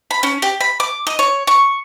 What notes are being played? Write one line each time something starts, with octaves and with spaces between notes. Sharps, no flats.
B5
C#4
G4
B5
D6
D#5
C#5
C#6